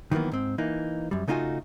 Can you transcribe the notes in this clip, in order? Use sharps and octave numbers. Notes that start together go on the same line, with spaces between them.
D#3 E3 F#3 A#3 B3
G#2 C4
E3 A#3 D#4
F#2 G3
C#3 A3 D#4 F4 F#4 G#5